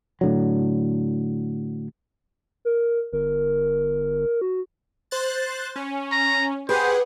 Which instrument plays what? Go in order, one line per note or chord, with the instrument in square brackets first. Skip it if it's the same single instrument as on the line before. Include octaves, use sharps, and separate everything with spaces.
[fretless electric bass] A2 D3 F#3
[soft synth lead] A#4
[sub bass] G1 [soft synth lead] A#4
[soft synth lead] F#4
[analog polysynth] C5 F#6 A6
C#4
[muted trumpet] A#5
[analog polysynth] G4 G#4 F#5 [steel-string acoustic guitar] B4 [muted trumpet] C5